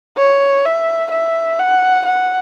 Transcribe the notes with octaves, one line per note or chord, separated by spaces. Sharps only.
C#5
E5
E5
F#5
F#5